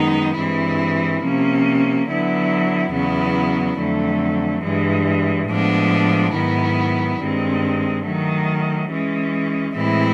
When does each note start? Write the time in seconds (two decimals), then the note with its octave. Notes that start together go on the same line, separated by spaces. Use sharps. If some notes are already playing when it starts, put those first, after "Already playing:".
Already playing: F#2 D#3 G#3 B3 D#4
0.37 G2 E3 G#3 C4 E4
1.22 C3 F3 A#3 C#4
2.07 D3 F#3 B3 E4
2.93 E2 C#3 F#3 B3 E4
3.78 F2 D3 F#3 A3
4.64 G2 E3 G#3
5.49 A2 F3 G#3 B3 D4
6.34 G#2 D#3 F#3 B3 E4
7.19 G2 D#3 G#3 C4
8.05 D#3 F#3 A3
8.90 E3 G#3 C#4
9.75 A2 E3 G#3 C4 E4